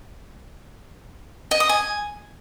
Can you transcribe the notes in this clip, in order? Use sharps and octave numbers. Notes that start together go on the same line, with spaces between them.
D#5
D#6
G#5